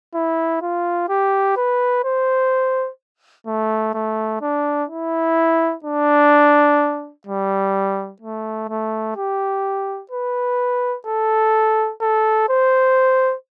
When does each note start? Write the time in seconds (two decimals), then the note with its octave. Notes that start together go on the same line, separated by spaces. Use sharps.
0.15 E4
0.62 F4
1.09 G4
1.57 B4
2.04 C5
3.46 A3
3.94 A3
4.42 D4
4.89 E4
5.84 D4
7.27 G3
8.21 A3
8.69 A3
9.17 G4
10.11 B4
11.07 A4
12.01 A4
12.49 C5